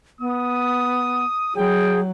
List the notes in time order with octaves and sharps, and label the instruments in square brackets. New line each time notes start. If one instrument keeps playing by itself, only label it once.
[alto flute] B3 [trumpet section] D#6
[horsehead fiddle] F#3 [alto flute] G#4 [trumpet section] G5